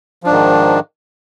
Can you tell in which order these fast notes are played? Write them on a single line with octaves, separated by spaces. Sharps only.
F3 D4 G#2 D#3